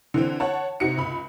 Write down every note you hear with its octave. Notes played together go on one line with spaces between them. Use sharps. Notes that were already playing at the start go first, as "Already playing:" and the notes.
D3 E3 C4
C#5 F#5 A5
C3 D#4 F#4 C#7
C#2 B5